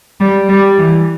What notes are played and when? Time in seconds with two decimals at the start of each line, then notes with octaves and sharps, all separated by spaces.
0.20 G3
0.49 G3
0.77 E3